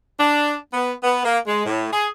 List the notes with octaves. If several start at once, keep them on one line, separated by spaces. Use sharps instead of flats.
D4
B3
B3
A#3
G#3
A2
G#4